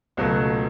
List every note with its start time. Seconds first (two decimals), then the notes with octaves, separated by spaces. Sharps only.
0.17 C#2 B2 F#3 A3